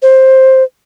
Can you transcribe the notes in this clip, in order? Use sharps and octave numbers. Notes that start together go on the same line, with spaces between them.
C5